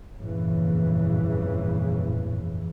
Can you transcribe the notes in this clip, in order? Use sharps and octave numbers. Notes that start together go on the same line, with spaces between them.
G1 F2 A#2 C#3 E3